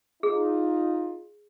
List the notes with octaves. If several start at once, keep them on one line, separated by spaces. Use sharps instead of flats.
D#4 F4 G#4